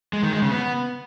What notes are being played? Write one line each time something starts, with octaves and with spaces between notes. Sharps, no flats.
G#3
D#3
G#3
C#3
B3